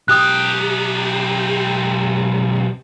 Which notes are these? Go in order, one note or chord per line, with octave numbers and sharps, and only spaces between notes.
B1 G4 D#6 F#6